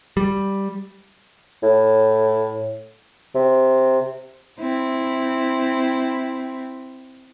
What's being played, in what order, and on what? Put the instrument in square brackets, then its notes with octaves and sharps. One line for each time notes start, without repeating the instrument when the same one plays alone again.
[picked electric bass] G3
[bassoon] A2
C3
[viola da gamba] C4 E4